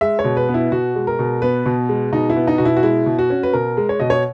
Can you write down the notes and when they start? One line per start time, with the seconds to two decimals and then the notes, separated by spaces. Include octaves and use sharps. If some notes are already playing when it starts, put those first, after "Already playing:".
0.01 G#3 E5
0.19 C#5
0.24 B2
0.37 B4
0.49 B3
0.54 E4
0.72 B2 F#4
0.95 G#3
1.07 A#4
1.19 B2
1.42 B3 B4
1.66 B2
1.89 G#3
2.12 B2 D#4
2.30 E4
2.37 B3
2.47 D#4
2.58 B2 F#4
2.65 E4
2.77 F#4
2.83 G#3 E4
3.06 B2
3.19 F#4
3.30 C#4
3.43 B4
3.53 B2 A#4
3.77 G#3
3.89 C#5
4.00 B2 D#5
4.10 C#5